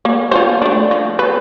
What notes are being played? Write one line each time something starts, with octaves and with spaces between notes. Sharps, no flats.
A#3
F4 F#4 C5
A3 D4
F3
B4